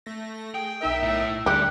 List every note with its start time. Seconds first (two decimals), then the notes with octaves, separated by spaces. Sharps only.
0.06 A3 A#6
0.54 G#4 G5
0.81 B1 D#4 A#4 E5
1.03 A2
1.46 D2 G3 G#3 G4 D5 F#5